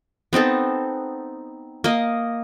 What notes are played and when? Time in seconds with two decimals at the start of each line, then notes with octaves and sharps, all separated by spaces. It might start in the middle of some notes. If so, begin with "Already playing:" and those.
0.33 B3 C4 D#4 A4
1.84 A#3 D#5